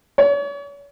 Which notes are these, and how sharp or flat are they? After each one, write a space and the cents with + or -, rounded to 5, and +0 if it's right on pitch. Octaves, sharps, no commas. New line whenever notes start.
C#5 +40